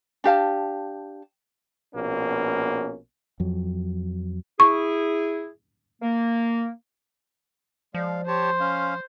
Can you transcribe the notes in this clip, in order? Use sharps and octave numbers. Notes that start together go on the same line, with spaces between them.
D4 G4 F5 A5
A#1 B2 A#3 C#4
F2 F#3
E4 G#4 C#6
A#3
F3 G#3 D5 F5
G4 C5 C#5 A5 C6
C#4 F5